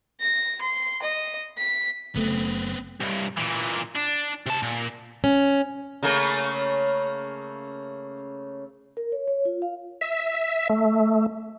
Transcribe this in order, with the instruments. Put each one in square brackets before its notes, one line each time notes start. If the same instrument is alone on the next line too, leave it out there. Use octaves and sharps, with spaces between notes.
[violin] A#6
C6
D#5
B6
[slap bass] F#1 [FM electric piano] C#3 A3 [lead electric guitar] B3 C4
[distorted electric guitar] C2 G2
A#2 E3
D4
C3 A5
A#2
[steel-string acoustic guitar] C#4
[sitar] C#3 A3 A#3
[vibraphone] A#4
C#5
C#5
F4
F5
[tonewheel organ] E5
A3